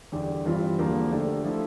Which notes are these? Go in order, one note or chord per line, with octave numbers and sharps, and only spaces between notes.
E2 D3 G3 D4 G4
G2 E3 G3 C4 F4
E2 D3 F3 A#3
D3 F3 A3 D4 G4
F3 A3 E4